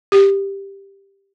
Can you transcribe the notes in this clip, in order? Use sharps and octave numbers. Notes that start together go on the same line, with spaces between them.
G4